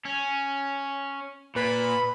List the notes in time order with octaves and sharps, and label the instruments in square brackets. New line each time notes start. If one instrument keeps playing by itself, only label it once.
[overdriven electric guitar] C#4
[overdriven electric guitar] A#2 [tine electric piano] B4 [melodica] B5